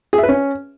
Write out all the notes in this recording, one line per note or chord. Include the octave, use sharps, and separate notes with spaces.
G#4
E5
B4
C#4